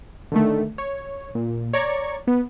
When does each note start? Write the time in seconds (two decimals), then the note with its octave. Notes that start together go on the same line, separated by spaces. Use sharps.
0.32 D3 D#3 A3
0.78 C#5
1.35 A#2
1.73 C#5 D5 A#5 G#6 C#7
2.27 B3